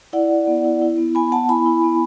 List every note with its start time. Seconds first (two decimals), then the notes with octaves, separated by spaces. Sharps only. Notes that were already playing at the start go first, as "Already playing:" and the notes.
0.13 E4 D5 F#5
0.30 E4
0.47 B3
0.64 E4
0.82 E4
0.98 B3
1.15 B3 G#5 B5
1.32 B3 F#5 A5
1.49 E4 G#5 B5
1.66 E4
1.84 B3